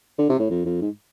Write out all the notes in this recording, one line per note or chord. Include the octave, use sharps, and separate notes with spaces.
D3
C3
A2
F2
F2
G#2